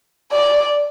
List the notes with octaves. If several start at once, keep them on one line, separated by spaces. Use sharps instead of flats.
D5